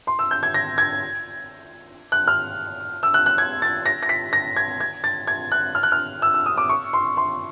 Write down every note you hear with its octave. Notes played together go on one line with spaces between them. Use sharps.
C6
E6
G6
G#6
A#6
G#6
F#6
F6
E6
F#6
F#6
G#6
A6
A#6
A#6
B6
A#6
G#6
G#6
A6
G#6
F#6
F6
F#6
F6
E6
E6
D#6
D6
C#6
C6
C6